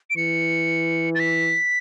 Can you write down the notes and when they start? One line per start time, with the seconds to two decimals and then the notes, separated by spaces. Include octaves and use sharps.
0.10 D7
0.17 E3 C#7
1.15 A6
1.20 B6